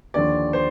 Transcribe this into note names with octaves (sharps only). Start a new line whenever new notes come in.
D#2 D3 F3 D5
C5